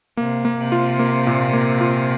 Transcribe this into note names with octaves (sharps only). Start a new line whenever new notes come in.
C3 A#3
A#3
C3
F4
A#3
A#2
A#3
F4